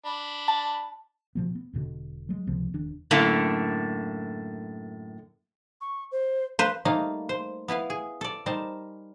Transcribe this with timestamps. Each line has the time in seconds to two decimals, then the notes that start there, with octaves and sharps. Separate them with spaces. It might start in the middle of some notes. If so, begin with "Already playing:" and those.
0.06 D4 B5
0.48 A5
1.35 B2 F3 B3
1.55 B3
1.73 E1 D2 B2 D3
2.29 F#3 G#3
2.47 C#2 C3 F3 B3
2.73 E1 D#3 D4
3.11 F#2 A2 D3 A3 A#3
5.81 C#6
6.12 C5
6.59 B4 C5 F5
6.85 G3 A3 A#3 D#4 F5
7.29 C5
7.68 B3 E4 B4 F5
7.90 G#4
8.21 A4 D5
8.46 G3 D#4 A#4 C5 A5